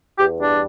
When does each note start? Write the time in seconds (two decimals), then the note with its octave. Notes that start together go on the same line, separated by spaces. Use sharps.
0.19 E2 G4
0.40 G3 D4